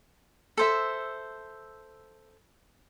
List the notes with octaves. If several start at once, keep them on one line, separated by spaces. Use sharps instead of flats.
A4 C5 E5